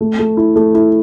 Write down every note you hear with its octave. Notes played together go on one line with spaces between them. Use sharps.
A3
A3
E4
A3
E4